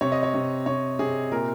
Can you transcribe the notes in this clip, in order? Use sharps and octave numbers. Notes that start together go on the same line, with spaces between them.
C3 C#5
D#5
C#5
C3
C3 C#5
C3 G#4
A#2 A#4